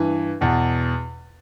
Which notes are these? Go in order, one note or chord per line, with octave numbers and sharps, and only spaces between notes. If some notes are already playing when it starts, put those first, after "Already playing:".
Already playing: G2 E3
E2 B2